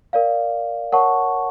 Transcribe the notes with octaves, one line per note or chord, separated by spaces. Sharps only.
A#4 D5 F5
A#4 C#5 F#5 A5 C#6